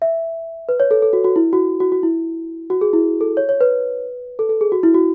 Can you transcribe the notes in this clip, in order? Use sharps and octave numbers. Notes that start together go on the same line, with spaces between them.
E5
B4
C#5
A4
A4
F#4
F#4
E4
F#4
F#4
F#4
E4
F#4
G#4
E4
A4
C#5
C#5
B4
A4
A4
G#4
F#4
E4
F#4